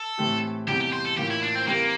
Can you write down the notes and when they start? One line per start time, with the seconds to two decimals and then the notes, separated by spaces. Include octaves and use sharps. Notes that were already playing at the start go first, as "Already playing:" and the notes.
Already playing: A4
0.18 A2 E3 A3 C4 G4
0.67 E2 C3 G3 G4
0.80 G4
0.93 C5
1.05 A4
1.17 A2 E3 A#3 F4 G4
1.30 E4
1.43 D4
1.55 C4
1.67 E3 G3 A#3 C4 G4 A#4